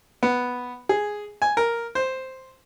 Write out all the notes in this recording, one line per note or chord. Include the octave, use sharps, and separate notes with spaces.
B3
G#4
G#5
A#4
C5